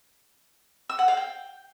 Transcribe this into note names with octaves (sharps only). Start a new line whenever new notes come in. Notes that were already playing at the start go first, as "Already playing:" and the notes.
E6
F#5
F5
G5